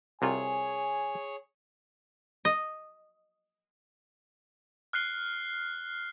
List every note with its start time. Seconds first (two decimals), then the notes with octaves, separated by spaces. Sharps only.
0.22 C2 C3 F4 G#4 C#5 G#5
2.45 D#5
4.93 F6 F#6 C7 G7